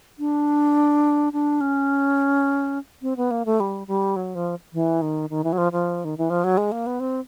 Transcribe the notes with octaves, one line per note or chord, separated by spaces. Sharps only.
D4
D4
C#4
C4
B3
A#3
A3
G3
G3
F#3
F3
E3
D#3
D#3
E3
F#3
F3
F3
D#3
E3
F3
F#3
G#3
A#3
B3
C4